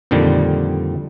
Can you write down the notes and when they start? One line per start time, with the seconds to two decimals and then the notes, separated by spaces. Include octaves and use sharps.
0.11 F2 A#2 D3 D#3 G3